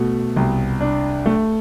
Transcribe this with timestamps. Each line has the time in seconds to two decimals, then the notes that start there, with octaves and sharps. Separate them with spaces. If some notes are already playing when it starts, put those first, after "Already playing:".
Already playing: B2 A3
0.36 C2
0.81 D4
1.26 A3